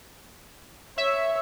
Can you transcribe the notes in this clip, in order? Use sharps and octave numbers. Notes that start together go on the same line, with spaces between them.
C#5 E5